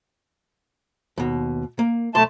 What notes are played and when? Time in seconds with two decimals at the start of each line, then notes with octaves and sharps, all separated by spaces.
1.18 D#2 B2
1.79 A#3
2.15 B1 A3 A5 C6